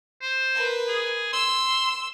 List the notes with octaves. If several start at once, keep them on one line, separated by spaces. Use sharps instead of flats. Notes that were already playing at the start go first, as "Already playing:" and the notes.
C5
A#4 B4
G#4
C6 E6